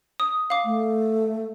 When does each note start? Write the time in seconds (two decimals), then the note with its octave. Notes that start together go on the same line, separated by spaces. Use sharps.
0.20 D#6
0.50 F5 D6
0.65 A3